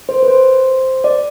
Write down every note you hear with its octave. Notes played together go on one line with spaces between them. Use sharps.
C5
B4
C5
D5